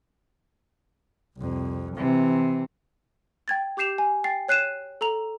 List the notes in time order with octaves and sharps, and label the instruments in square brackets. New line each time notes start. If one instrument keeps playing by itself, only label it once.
[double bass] C2 F2
[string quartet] C3 [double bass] E3
[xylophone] G5 G#6 A6
G4 D6 G6 C7 E7 F7
G#5
G5 A6 C7
C#5 F#6 C7 D#7 E7
A4 A#5 F7